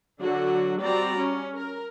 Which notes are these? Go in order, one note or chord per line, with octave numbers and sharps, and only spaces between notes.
D3 F#3 D4 F#4
G3 C4 F#4 D5 A#5
C#4
A#4